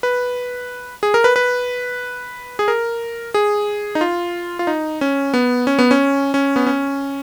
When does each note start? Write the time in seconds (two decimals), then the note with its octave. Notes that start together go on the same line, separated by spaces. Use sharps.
0.03 B4
1.03 G#4
1.14 A#4
1.24 B4
1.36 B4
2.59 G#4
2.68 A#4
3.34 G#4
3.95 D#4
4.01 F4
4.59 F4
4.67 D#4
5.01 C#4
5.34 B3
5.67 C#4
5.79 B3
5.91 C#4
6.34 C#4
6.56 B3
6.67 C#4